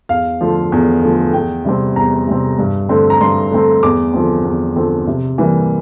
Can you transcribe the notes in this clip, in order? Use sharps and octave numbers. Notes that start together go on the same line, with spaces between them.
E2 F5
D3 F3 A3
E2
D3 F3 A3
E2 G5
C3 G3 C4
E2 A#5
C3 G3 C4
G2
D3 A3 C4
A#5
G2 C6
D3 A3 C4
E2 D6
D3 F3 C4
E2
D3 F3 C4
C3
E3 G3 A#3